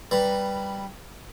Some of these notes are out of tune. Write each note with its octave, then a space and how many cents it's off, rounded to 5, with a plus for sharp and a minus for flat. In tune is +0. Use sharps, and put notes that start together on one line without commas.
G3 +0 B4 +0 A#5 -10